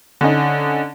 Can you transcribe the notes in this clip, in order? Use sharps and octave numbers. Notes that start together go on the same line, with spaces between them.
D3 C#4 D#4